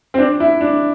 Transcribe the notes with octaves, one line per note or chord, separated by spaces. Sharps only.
C4
D4
E4
D4